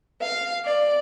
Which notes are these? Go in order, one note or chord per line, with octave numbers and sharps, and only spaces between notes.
F5
D5